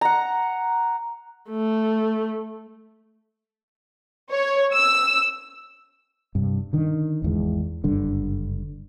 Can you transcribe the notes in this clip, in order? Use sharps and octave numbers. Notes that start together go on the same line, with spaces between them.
F#5 A#5
A3
C#5
E6
G2 C3
D3 D#3
G#1 E2 G#3
F#1 G2 D3